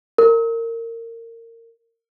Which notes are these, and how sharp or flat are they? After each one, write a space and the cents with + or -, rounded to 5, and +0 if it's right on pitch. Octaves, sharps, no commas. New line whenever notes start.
A#4 -25